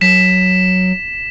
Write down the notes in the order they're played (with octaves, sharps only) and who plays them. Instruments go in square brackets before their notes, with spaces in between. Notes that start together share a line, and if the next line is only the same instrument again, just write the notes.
[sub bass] F#3 [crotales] B6 E7